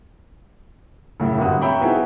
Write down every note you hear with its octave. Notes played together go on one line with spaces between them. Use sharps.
F#2 A2 C#3
G1 F#2 C3 F#4 D#6
C#5 E5 G5 A#5 B5 C#6
B3 C4 D#4 E4 F#4 G#4